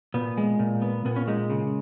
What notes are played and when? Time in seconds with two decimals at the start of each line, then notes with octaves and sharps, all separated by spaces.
0.14 A#2 B3
0.37 G#3
0.59 A#2
0.82 B3
1.05 A#2 B3
1.16 C#4
1.27 G#3 D#4
1.50 C#3